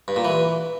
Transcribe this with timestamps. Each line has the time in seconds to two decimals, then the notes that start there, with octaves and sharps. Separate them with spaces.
0.08 G2
0.16 A#2
0.25 E3